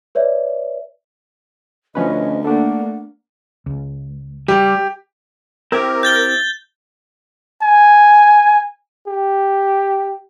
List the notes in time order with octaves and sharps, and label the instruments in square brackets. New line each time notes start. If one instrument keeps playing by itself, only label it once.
[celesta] B4 C#5 D5 E5
[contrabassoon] D2 [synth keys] F3 C#4 B4 [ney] D#5
[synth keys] A3 D4 [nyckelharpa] A#3 [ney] F#5
[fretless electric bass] C#2
[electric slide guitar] G3 [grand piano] G4
[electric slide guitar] C4 E4 G4 [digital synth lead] A#4
[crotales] G6 A6 G7
[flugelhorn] G#5
G4